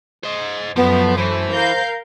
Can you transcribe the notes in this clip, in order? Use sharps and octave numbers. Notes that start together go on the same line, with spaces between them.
C5 D#5
F#2 F3 A3 B3
E3 C5
A#4 F5 G6